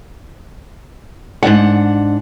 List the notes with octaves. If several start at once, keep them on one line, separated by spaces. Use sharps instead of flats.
G#2 E3 D4 F#5